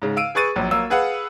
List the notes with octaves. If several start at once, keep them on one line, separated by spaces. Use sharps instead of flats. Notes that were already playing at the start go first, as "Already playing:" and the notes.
G#2 C#3
F5 E6 D7 D#7
G#4 B4 C#6 A6 D#7
A#1 F#3
F#3 A#3 E6
G#4 B4 F5 F#5